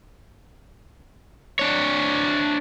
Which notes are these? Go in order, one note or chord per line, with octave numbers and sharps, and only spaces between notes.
D4 C#5